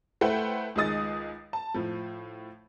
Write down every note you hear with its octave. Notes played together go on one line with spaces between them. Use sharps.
A3 E4 B4 C5 F#5 G5
C#2 D#3 G#4 D#5 D#6 A6
A5
A2 F3